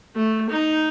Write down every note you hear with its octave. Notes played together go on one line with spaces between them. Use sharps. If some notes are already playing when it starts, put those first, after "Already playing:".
A3
D#4